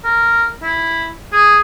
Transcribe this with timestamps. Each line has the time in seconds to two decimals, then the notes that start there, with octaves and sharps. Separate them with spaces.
0.04 A#4
0.63 E4
1.33 G#4